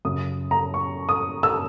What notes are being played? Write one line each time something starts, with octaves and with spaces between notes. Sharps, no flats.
F#2 C#3 F#3 D#6
A#5
C#6
D#6
E6